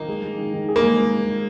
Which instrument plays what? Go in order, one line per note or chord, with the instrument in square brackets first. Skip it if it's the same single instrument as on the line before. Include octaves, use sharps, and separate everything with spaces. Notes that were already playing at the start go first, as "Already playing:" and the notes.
Already playing: [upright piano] D#3 [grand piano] A#3 D#4
[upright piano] G#3
G#3
D#3
D#3
G#4
[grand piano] A#3
[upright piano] G#3